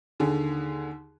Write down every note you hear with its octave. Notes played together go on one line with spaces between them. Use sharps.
D#2 D3 G#4